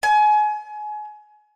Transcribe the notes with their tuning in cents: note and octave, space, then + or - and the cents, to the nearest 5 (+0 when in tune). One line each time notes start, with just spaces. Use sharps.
G#5 +30